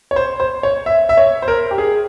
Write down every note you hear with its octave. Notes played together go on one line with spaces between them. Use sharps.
C#5
C5
C5
C#5
E5
E5
C#5
C5
A#4
G4
G#4